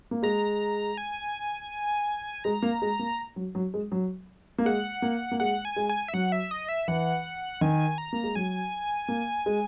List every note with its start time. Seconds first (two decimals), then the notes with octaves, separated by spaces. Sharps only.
0.11 A#3
0.23 G#3 A#5
0.97 G#5
2.44 G#3 A#5
2.62 A#3
2.82 G#3
2.99 A#3
3.36 F#3
3.55 F#3
3.74 G#3
3.92 F#3
4.58 A#3
4.66 G#3 F#5
5.02 A#3
5.31 A#3
5.40 G#3 F#5
5.65 G#5
5.76 G#3
5.89 G#5
6.08 E5
6.13 F#3 F#5
6.32 E5
6.51 D#5
6.69 E5
6.88 E3 F#5
7.61 D#3 G#5
7.98 A#5
8.13 A#3
8.24 G#3
8.35 F#3 G#5
9.08 A#3
9.46 G#3